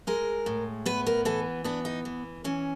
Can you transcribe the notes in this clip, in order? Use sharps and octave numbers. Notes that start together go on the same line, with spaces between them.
G#3 A#4
A2
B3 B4
A#4
E3 A4
B3 D4
D#4
E3
E3 C#4